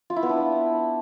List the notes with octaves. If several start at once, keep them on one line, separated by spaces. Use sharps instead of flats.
F4
E4
B3
D4